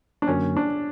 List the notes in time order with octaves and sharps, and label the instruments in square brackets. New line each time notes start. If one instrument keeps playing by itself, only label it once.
[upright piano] D4
[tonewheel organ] F#2 D3 F#3 A#3 [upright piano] C#4
[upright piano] D4